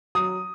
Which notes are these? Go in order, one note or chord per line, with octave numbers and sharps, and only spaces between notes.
F#3 D#6